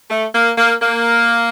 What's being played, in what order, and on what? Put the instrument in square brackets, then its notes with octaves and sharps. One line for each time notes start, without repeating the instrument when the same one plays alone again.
[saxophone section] A3
A#3
A#3
A#3